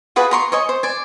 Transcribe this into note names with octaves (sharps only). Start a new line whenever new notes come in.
F4 F#4 G#4 B4
A#5 C6 C#6
C#5 D#5 G#5 C#6
C5
D5 G#5